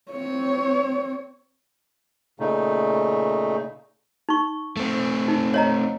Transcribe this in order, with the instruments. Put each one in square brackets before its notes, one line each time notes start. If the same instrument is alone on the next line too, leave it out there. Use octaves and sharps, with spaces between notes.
[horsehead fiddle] C4 C#5
[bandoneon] A#2 C#3 A3 D#4
[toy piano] D#4 C#6
[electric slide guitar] A3 C4
[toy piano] D#4
C#5 D#5 A#5